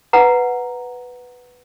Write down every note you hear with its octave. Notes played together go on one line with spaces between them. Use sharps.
B4 F#5 A#5